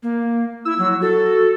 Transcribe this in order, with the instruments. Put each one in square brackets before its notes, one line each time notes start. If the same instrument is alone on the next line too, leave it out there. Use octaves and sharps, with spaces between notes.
[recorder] A#3
[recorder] E4 [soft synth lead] E6
[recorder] F#3
[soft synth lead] F#4 [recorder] A4